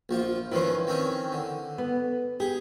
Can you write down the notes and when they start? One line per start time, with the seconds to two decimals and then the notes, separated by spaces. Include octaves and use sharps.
0.09 A#1 F3 F4
0.52 D#3 F3 C#4 E4 B4 C5
0.87 D#3 C4 C#4
1.32 D3
1.78 B3
2.40 G4 G#4